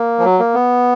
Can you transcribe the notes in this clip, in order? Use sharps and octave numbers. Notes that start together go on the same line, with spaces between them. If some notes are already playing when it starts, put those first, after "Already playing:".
Already playing: A#3
F3
F#3
A#3
B3